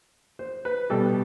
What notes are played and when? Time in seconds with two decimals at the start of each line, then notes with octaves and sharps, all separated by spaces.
0.39 C5
0.65 B4
0.90 B2 G3 A4